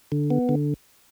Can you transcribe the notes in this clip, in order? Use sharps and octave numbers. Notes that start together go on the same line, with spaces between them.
D3
B3
D3